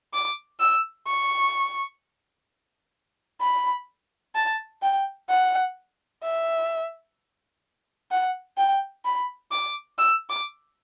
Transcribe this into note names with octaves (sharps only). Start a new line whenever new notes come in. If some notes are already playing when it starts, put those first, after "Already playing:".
D6
E6
C#6
B5
A5
G5
F#5
E5
F#5
G5
B5
D6
E6
D6